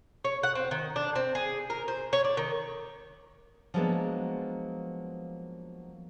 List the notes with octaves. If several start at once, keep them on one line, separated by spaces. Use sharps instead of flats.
C#5
F#5
C4
D#3
D4
C4
G#4
A#4
C5
C#5
D5
D#3
F3 F#3 G#3 A#3 B3 D4